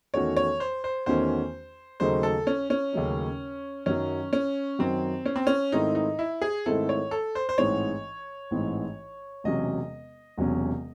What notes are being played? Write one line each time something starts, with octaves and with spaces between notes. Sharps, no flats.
E2 D#3 A3 C#4 F#4 C#5
C#5
C5
C5
E2 D#3 A3 C#4 F#4 C5
D#2 C#3 F#3 A3 D#4 C5
A4
C#4
C#4
D#2 C#3 F#3 A3 D#4
F#2 D#3 F#3 C#4
C#4
F#2 D#3 F#3 C4
C#4
C4
C#4
G#2 D#3 A3 C4 D#4 E4
D#4
E4
G#4
G#2 D#3 A3 C4 E4 A4
C#5
A4
C5
C5
A1 G#2 E3 C4 D#4 C#5
A1 G#2 E3 C4 D#4
E1 E2 C3 F#3 C#4 D#5
E1 E2 C3 F#3 C#4